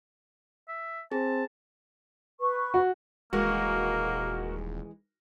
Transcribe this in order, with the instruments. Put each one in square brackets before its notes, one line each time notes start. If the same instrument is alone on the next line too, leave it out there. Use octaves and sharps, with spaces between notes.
[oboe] E5
[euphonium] C4 [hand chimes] G#4 [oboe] A5
[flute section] B4 C#6
[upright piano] F#4
[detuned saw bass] D#1 [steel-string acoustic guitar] E3 G#3 G#4 [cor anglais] A#3 [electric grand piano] F#4 A#4